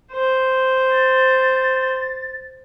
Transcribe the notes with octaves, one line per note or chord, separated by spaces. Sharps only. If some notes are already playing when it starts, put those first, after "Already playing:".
C5
A6